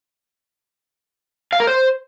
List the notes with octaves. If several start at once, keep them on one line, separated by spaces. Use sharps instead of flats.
F5
A#4
C5